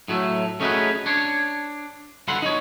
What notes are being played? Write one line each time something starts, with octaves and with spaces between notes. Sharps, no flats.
A2 F#3 G#3 A3
A3 C#4 D#4 F#4 G#4 B4
D4 C#5
G2 D3 B4 F#5 C6
D#4 C#5